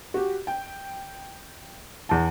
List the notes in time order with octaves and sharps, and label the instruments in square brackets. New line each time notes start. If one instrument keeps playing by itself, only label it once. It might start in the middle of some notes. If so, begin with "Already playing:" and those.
[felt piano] F#4 G4
G5
E2 A5